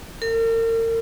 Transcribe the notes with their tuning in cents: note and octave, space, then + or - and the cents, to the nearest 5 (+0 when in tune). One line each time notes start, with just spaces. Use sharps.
A#4 -40